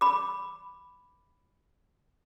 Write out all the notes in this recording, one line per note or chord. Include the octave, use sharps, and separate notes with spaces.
B5 D6